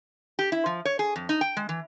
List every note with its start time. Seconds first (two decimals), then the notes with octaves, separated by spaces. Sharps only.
0.39 G4
0.52 E4
0.66 F3
0.85 C#5
0.99 G#4
1.16 F2
1.29 D#4
1.41 G5
1.57 G#3
1.69 E3